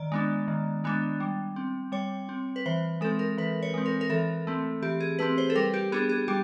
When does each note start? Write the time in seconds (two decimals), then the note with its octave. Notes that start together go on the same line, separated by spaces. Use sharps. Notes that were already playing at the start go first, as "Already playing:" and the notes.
Already playing: D#3 D5
0.12 G#3 B3 D4
0.48 D#3
0.84 G#3 B3 D4
1.20 G3
1.56 C4
1.92 G3 C#5
2.29 C4
2.56 B4
2.66 E3 C5
3.01 G#3 A4
3.04 C4
3.19 A#4
3.38 E3 B4
3.63 C#5
3.74 G#3 C4
3.86 A#4
4.01 A#4
4.10 E3 A4
4.47 A3 C4
4.82 E3 G4
5.00 G#4
5.19 A3 C4 B4
5.38 C5
5.50 A4
5.55 G3 A#4
5.74 G4
5.92 B3 D4 G#4
6.09 G#4
6.28 G3 G4